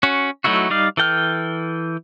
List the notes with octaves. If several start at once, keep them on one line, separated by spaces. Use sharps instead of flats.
C#4 F#4
F#3 A3 D#4 E4 F#4
G3 D#4 D5 F5
E3 A4 G5 F6